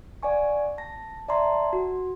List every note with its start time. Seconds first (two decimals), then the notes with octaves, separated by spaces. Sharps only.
0.23 D5 F#5 G#5 C#6
0.78 A5 A#6
1.28 D5 E5 A5 A#5 C6
1.73 F#4